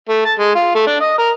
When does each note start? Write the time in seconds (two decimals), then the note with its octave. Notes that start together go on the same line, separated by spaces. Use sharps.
0.09 A3
0.25 A5
0.39 G#3
0.55 F4
0.75 A3
0.87 D4
1.01 D#5
1.18 A#4